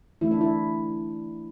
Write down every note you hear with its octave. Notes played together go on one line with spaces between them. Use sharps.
E3 A3 E4
D4
E4